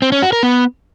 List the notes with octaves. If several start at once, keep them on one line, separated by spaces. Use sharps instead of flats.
C4
C#4
F#4
A#4
B3